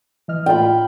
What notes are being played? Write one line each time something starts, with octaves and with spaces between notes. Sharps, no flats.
E3 D#5 F6
A2 F4 G5 B5